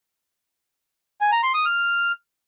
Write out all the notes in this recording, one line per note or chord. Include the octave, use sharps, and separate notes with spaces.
G#5
A#5
C6
D#6
F6